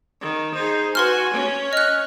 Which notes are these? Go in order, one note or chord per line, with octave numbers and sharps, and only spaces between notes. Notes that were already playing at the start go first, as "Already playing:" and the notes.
D#3
D#4 G#4 C5
F#4 B4 G#5 C6 F6
C#4
D#5 F6 F#6